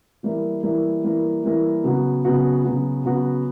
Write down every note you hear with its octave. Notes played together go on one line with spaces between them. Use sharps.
E3 G3 A#3 E4 A#4
E3 G3 A#3 E4 A#4
E3 G3 A#3 E4 A#4
E3 G3 A#3 E4 A#4
C#3 F#3 B3 F#4
C#3 F#3 B3 F#4
C#3 F#3 B3 F#4
C#3 F#3 B3 F#4